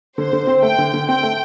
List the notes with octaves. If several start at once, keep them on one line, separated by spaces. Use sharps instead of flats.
D3 C5
D3
C4
A3 G5
D3
D3
C4 G5
A3